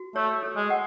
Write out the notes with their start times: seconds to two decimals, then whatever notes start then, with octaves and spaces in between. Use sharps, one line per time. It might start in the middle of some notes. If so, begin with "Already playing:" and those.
Already playing: F#4
0.16 A3 C#5
0.42 A4
0.56 G#3
0.70 F#5